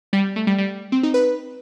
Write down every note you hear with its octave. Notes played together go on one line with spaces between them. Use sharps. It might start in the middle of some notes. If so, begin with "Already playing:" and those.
G3
A3
G3
G3
C4
D#4
B4